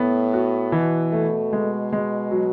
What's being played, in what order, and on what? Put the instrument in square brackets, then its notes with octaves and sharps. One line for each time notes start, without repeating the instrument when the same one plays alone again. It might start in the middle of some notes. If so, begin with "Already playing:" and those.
Already playing: [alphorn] A2 [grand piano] B3
[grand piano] F#4
[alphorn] B2 [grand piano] E3
[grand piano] A3
G#3
G#3
F#3